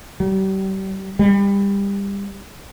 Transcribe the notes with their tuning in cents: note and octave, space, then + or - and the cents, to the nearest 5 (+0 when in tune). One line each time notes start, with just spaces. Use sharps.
G3 -35
G3 +25